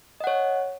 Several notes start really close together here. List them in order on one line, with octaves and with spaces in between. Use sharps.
D#5 F#5 C#5